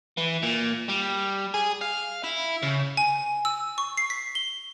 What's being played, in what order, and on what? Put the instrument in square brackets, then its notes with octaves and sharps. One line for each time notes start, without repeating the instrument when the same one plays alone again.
[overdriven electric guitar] E3
A#2
G3
G#4
F5
E4
C#3
[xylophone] G#5
E6
C#6
C7
B6
G7